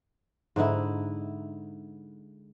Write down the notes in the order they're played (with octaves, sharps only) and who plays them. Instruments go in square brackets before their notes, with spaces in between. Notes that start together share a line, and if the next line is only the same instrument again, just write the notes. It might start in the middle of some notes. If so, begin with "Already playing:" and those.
[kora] G#2 D3 D#4 E4